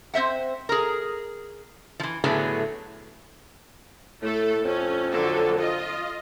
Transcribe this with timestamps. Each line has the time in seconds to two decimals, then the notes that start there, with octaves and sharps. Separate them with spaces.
0.14 C4 C5 E5 F#5
0.69 G#4 A#4
2.00 E3 F3
2.24 A2 D3 F#3 A3 B3 G#4
4.22 A2 A3 A4
4.65 F2 C#4
5.12 D3 F#3 A4
5.59 F4 D#5